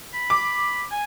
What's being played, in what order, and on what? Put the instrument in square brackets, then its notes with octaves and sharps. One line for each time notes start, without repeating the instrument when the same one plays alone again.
[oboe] B5
[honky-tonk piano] D6
[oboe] G#5